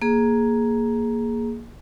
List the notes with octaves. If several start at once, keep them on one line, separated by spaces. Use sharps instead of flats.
A#3 G#4